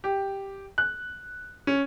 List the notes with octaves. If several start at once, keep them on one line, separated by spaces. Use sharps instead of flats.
G4
F#6
C#4